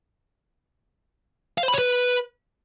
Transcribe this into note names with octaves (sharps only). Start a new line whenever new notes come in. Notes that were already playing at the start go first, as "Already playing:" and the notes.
F5
C5
B5
C#5
B4